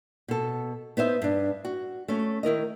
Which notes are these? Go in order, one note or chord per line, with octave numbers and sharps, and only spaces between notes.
B2 A4
B3 D#4 C5 E5
G2 D4
F#4
A3 C#4
D#3 E4 A#4 D#5